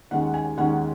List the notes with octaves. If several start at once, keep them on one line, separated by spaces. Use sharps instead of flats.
D#2 D#3 G#3 C#4 F#5
G#5
D#2 D#3 G#3 C#4 F#5